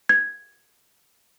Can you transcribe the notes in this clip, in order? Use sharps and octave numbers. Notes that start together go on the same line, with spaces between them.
G#6